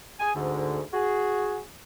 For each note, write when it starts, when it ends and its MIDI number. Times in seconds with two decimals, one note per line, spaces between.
0.20 0.31 68
0.20 0.31 80
0.35 0.82 38
0.35 0.82 44
0.35 0.82 50
0.93 1.61 66
0.93 1.61 68